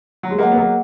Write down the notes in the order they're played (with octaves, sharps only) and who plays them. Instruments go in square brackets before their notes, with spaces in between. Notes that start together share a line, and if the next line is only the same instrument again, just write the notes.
[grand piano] F#3
G#3
[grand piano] F#3 A#3 [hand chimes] G#4 D#5 F#5
[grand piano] B3
F#3 A#3